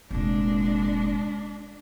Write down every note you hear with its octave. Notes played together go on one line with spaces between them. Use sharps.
F1 A#2 G#3 D4